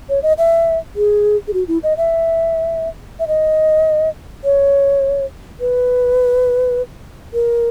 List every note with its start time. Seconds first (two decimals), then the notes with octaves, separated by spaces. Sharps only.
0.09 C#5
0.23 D#5
0.38 E5
0.96 G#4
1.47 G#4
1.53 F#4
1.68 E4
1.83 D#5
1.97 E5
3.19 E5
3.28 D#5
4.44 C#5
5.60 B4
7.33 A#4